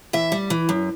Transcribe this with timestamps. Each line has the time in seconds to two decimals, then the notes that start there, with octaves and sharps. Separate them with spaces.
0.13 E3 E5
0.32 G3
0.50 E3
0.69 F#2